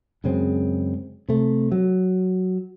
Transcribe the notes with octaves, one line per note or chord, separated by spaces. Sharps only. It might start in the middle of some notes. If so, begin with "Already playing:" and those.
F#2 C#3 G#3 C4
C3 A3
F#3